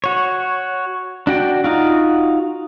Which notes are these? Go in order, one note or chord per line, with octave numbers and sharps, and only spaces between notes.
F#4 C#5
D4 F#4 G5
D#4 F4 F#4